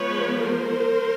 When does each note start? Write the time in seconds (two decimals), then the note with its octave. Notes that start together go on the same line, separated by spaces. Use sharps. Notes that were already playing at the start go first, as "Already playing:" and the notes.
Already playing: F3 G#3 B3 B4 C#5
0.38 A#4 C5